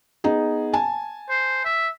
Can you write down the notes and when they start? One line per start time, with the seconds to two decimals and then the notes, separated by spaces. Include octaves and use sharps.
0.24 B3 D#4 G#4
0.73 G#5 A5
1.30 C5
1.64 E5